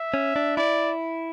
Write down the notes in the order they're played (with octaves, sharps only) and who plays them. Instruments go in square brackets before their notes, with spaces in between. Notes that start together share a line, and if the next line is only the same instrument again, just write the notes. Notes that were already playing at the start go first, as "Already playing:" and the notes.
Already playing: [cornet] E5
[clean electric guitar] C#4
D4
[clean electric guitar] E4 [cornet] D5